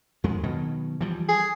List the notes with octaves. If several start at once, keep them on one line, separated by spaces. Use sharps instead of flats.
F2 G#3
B2 D#3 F#3
E3 F3 G3
G#4